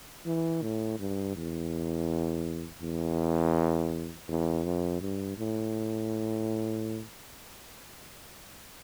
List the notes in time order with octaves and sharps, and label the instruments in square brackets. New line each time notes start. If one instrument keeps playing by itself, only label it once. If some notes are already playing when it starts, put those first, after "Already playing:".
[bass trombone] E3
A2
G2
E2
E2
E2
F2
G2
A2